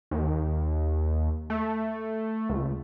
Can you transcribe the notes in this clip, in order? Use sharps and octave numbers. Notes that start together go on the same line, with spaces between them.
D#2
A3
C#2